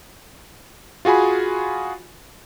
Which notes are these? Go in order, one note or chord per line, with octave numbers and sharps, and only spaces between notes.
F4 F#4 G#4 G#5 B5